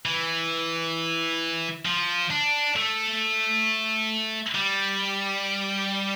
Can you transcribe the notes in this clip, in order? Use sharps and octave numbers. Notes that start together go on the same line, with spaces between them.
E3
F3
D4
A3
G3